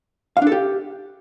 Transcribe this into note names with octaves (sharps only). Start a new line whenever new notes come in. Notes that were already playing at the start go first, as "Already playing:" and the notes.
F5
D4
A4
G4